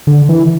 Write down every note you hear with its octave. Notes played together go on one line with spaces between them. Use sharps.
D3
E3